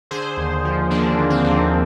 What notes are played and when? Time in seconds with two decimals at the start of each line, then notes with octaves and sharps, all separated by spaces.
0.11 D3 G#4 C5
0.37 D#2
0.65 F3
0.90 D3 A#3 D4
1.17 D#2
1.30 C4
1.44 D#2